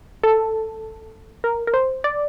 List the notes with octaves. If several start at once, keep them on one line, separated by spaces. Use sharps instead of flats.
A4
A#4
A#4
C5
D5